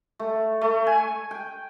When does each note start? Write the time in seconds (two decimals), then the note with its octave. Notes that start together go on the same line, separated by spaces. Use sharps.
0.19 A3
0.61 A3
0.87 G#5
1.31 G5